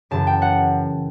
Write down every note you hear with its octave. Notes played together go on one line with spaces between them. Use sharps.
F#2 C#3 E3 A5
G5
F#5